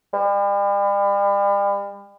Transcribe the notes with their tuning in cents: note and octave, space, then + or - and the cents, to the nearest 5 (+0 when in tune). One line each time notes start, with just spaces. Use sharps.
G3 +40